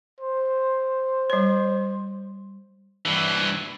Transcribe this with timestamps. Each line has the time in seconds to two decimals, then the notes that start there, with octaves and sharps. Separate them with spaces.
0.21 C5
1.30 G3 C#5
3.05 G2 E3